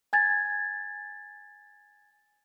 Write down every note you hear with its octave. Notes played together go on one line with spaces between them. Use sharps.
G#5 G#6 A6